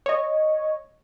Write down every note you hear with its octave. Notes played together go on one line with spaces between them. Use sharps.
C#5 D#5